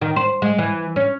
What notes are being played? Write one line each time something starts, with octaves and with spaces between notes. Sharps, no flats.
D#3
C5
G#3
E3
C#4